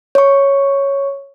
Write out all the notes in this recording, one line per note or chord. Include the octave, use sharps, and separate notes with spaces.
C#5 C#6